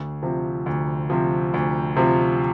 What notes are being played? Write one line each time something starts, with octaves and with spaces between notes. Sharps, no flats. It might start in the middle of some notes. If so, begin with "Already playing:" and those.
Already playing: D2
C3 F3
D2
C3 F3
D2
C3 F3